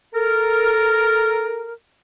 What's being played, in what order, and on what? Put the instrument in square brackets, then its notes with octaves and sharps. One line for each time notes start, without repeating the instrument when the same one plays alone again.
[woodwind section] A4 A#4